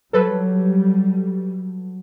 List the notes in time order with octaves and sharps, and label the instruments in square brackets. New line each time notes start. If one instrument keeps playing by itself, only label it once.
[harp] F#3 [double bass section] G3 [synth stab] A4 B4